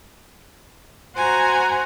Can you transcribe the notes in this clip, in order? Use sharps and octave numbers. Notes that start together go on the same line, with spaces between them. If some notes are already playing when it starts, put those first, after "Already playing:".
F#4 C5 F#5 G#5 A#5